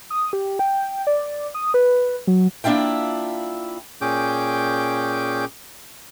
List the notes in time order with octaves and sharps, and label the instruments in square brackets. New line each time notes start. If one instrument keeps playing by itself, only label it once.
[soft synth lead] D#6
G4
G5
D5
D#6
B4
F#3
[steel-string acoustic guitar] A#3 D4 E4 F4 G5
[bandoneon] A#2 C#4 G#4 G5 D6 G6